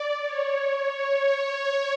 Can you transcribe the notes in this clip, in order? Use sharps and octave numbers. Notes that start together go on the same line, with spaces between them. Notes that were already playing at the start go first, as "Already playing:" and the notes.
Already playing: D5
C#5